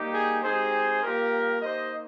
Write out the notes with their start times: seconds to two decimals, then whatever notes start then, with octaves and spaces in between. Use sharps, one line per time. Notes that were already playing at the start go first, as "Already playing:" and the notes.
Already playing: G3 A#3 D#4 G4
0.14 G#4
0.43 G#3 C4 D#4 G4 G#4 C5
1.02 G3 A#3 F4 G4 A#4
1.61 A#3 D#4 G4 C5 D#5